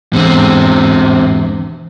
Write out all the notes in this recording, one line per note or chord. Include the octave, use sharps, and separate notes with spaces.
E2 G#2 B2 D3 C4